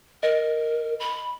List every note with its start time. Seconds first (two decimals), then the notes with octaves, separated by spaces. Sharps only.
0.23 A#4 D#5 A#6
1.00 B5